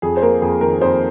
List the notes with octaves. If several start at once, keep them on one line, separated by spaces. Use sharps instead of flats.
F2 G#4
C5
A#3 A#4
F2 G#4
D#3 A#4
F2 C5